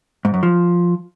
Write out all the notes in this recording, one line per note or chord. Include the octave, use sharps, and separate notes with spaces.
G#2
F#2
F3